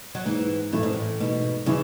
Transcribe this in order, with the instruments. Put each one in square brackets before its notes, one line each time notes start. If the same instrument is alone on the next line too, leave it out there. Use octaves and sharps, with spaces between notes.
[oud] F#3
[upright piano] G#2 [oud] E3
[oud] A2 [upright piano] E3 A3 E4
[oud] G#2
A2
[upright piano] G#2 [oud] B2
[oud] C#3 [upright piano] E3